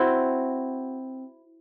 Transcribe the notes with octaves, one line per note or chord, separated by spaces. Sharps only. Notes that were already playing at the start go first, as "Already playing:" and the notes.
Already playing: C4 E4 F#4